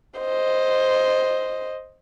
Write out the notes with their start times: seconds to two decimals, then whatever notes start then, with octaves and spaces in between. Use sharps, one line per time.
0.18 C5 D#5